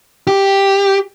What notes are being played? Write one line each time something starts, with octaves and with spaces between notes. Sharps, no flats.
G4